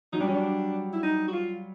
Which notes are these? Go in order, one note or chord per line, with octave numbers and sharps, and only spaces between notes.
F#3 D#4
G3 D4
F#3 C#4
D4
E4
D#4
F#4
F4